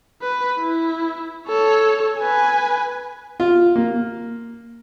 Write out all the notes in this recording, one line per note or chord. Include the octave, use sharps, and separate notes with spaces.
B4
E4
A4 C#5
B4 G#5
F4
A#3